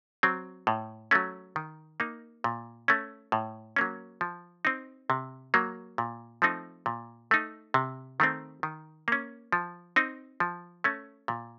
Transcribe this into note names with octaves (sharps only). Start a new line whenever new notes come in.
F#3 C4
A2
F#3 A3 C#4
D#3
A#3 D#4
A#2
A3 C#4
A2
F#3 A#3 C#4
F3
C4 D#4
C3
F#3 A#3
A#2
F3 A3 C4 D#4
A#2
A3 D#4
C3
D#3 A3 C4
D#3
A#3 C#4
F3
C4 D#4
F3
A3 C#4
A#2